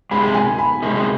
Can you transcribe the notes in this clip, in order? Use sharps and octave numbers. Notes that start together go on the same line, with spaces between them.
C3 D#3 G#3 B5
G#5
B5
C3 D#3 G#3